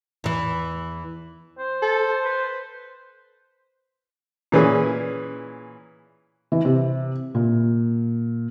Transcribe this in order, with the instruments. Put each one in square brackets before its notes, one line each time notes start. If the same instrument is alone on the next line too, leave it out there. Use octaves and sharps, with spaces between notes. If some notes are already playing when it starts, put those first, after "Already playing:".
[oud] E2 E3
[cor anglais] C5
[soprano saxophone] A4
B4
[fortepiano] A#2 E3 C#4 G#4
[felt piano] E3
C3
A#2